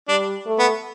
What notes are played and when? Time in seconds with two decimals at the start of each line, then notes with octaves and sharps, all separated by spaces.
0.08 G3 D4
0.46 A3
0.59 B3